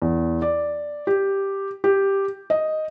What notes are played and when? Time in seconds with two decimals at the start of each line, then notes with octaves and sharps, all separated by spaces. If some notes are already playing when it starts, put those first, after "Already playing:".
0.02 E2
0.42 D5
1.07 G4
1.84 G4
2.50 D#5